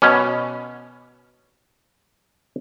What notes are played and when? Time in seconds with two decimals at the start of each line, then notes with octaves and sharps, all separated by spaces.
0.02 B2 C#4